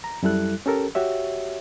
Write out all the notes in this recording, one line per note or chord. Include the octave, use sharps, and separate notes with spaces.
A#5
F#2 G3 E4 A4 F#6
C#4 G4 A4 A#4
F#4 G4 C#5 E5